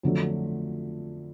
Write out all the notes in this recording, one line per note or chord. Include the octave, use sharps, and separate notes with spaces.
F2 D3 F#3 A3